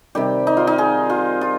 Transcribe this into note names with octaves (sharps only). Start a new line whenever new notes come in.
C3 D#3 G3 G4
D#4
F4
D#4
G#4
F4
F4